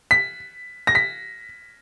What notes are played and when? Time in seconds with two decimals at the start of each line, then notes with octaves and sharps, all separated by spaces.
0.11 B6
0.87 A#6
0.95 B6